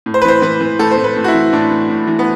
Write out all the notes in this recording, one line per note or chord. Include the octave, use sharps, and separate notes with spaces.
A2
C5
B4
E3 C5
E3 B4
E3
A2 A4
C5
A2
B4
A2
F#4
E4
E3
A2 D4
E3
A2
E3
B3